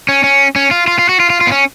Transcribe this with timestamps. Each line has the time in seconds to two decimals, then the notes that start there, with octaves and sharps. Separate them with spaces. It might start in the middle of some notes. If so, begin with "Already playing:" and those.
0.09 C#4
0.24 C#4
0.56 C#4
0.71 F4
0.88 F4
0.99 F4
1.09 F#4
1.20 F4
1.30 F4
1.41 F4
1.47 B3
1.52 C#4